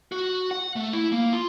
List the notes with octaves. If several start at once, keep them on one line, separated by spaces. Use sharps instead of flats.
F#4
F#5
A3
E4
A#3
F4